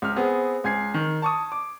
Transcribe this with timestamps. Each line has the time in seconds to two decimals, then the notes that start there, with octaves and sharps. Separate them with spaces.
0.02 C#2 F6
0.16 B3 C4 G#4
0.64 C#2 G#5 G#6 C7
0.94 D#3
1.22 A5 C#6 D#6
1.52 D6